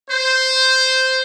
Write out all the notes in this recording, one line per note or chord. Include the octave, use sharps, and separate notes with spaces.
C5